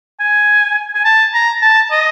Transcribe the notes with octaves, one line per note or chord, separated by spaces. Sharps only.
G#5
G#5
A5
A#5
A5
D#5